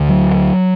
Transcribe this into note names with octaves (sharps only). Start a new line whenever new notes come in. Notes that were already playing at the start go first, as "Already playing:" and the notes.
Already playing: D2 D3
F#3